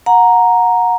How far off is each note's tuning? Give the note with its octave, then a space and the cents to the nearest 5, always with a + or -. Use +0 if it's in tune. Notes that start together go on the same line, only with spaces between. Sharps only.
F#5 -25 A#5 +0